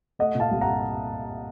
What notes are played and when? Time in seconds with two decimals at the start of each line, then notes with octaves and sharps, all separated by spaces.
0.19 A3 D#5 F#5
0.35 A#2
0.40 F5 A5
0.51 C2
0.61 F#5 A#5